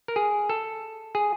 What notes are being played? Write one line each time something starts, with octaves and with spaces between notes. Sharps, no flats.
A#4
G#4
A4
G#4